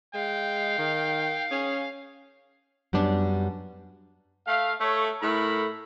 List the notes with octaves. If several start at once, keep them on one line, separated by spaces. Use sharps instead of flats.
G#3 F5 G5
D#3
C#4 G#4
F#2 G3 B3 D4
A3 F5
A3 C#5
A2 A3 A#4 B5